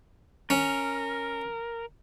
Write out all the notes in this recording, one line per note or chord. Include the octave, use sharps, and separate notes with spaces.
C#4 A#4